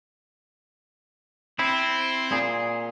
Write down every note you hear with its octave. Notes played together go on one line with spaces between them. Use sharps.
C4 E4
A#2 G#4